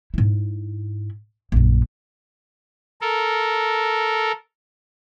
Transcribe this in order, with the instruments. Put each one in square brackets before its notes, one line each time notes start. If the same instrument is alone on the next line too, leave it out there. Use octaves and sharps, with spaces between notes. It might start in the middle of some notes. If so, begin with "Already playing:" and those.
[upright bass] G#2 E4
A#1 F#2
[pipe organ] A4 A#4